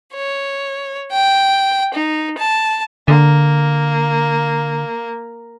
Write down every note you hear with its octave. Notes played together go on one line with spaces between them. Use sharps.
C#5
G5
D#4
A5
D3 A#3